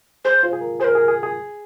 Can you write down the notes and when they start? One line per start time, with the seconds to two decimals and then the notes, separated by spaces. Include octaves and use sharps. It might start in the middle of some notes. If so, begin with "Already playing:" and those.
0.25 G#4 C5
0.43 F4
0.53 G#4
0.61 A#4
0.80 G#4 C5
0.84 A#4
0.95 G#4
1.08 G#4
1.23 G#4